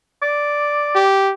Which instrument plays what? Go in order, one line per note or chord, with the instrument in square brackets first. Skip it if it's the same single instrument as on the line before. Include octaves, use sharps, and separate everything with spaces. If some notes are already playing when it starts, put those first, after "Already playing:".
[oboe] D5
[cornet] G4